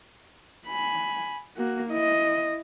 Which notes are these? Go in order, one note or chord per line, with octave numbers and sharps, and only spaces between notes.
G#5 B5
A#3 F#4
E4 D#5